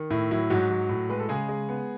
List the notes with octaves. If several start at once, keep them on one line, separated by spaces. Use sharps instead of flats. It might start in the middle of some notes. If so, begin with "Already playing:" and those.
Already playing: D#3
A2 E4
F#3 E4
G#2 F#3 F#4
F#3
A2
G#3 B4
A4
C#3 G#3 G#4
G#3
B3